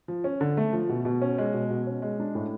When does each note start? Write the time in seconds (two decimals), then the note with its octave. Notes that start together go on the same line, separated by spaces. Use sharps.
0.08 F3
0.24 C#4
0.41 D3
0.57 A3
0.73 F3
0.89 B2
1.05 B2
1.22 C#4
1.38 G#3
1.54 B2
1.70 B2
1.87 C#4
2.02 G#3
2.20 D4
2.35 A2